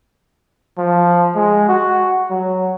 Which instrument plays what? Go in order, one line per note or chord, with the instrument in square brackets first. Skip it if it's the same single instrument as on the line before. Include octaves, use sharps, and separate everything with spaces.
[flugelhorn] F3
G#3
F#4
F#3